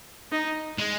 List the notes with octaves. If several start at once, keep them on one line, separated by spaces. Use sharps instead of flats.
D#4
G#3